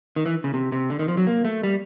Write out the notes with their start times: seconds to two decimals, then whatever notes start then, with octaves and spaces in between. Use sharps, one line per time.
0.16 D#3
0.26 E3
0.44 C#3
0.54 C3
0.72 C3
0.90 D3
0.99 D#3
1.08 F3
1.17 F#3
1.27 A#3
1.45 A3
1.63 G3